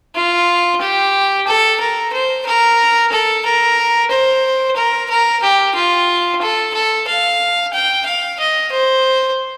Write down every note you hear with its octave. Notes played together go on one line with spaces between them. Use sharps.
F4
G4
A4
A#4
C5
A#4
A4
A#4
C5
A#4
A#4
G4
F4
A4
A4
F5
G5
F5
D#5
C5